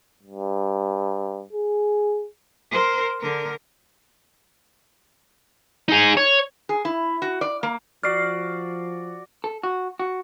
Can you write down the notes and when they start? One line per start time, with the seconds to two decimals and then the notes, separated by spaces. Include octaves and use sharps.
0.23 G2
1.53 G#4
2.71 A#4 C5
3.20 D3 A#4
5.88 D#4 G#4
6.17 C#5
6.69 G#4
6.85 E4
7.22 F#4
7.41 D5
7.63 A#3
8.03 F3 F#4 D5 F6 C7
9.44 A4
9.63 F#4
9.99 F#4